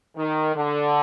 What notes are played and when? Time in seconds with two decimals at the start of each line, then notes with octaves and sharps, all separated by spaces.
0.16 D#3
0.55 D3